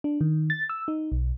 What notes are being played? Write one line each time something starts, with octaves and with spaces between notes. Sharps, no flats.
D4
D#3
A6
E6
D#4
B1